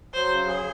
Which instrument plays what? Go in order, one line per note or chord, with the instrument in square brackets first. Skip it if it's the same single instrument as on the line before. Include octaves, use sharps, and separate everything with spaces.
[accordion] F#3 [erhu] C5
[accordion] C#3
G#4